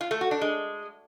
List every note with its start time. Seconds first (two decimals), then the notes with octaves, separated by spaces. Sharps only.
0.01 F4
0.11 A3
0.21 F#4
0.31 D4
0.41 G#3